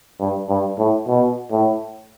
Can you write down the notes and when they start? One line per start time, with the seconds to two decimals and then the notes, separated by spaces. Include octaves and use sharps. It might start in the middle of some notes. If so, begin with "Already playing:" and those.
0.20 G2
0.49 G2
0.79 A2
1.08 B2
1.52 A2